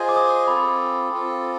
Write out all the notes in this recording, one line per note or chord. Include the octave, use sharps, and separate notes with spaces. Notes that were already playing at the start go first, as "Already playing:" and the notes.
Already playing: F4 G#4 C5 D#5 G#5
D6
D#6
C4 F4 A4 B5
C4 F4 A4